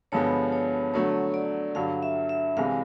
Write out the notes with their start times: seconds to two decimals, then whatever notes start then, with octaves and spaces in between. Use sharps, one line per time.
0.12 G2 D3 F3 G#3 B3 C#5
0.52 C#5
0.93 D3 F#3 A3 C#5
1.34 D5
1.75 G2 D3 F#3 F5
2.03 E5
2.29 E5
2.57 C2 C3 E3 G#3 F5